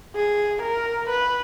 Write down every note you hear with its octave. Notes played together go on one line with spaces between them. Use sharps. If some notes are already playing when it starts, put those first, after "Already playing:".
G#4
A#4
B4